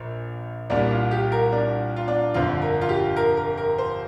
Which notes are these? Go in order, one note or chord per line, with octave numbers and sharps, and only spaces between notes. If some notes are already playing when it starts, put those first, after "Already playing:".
Already playing: A#1 A#2
C2 A#2 G3 D4
F4
G4
A#4
D4
F4
D4
G1 F2 D3 F3 F4
A#4
F4
G4
A#4
A#4
A#4
C5